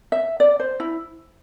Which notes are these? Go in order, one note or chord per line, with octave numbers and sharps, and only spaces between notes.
E5
D5
C5
E4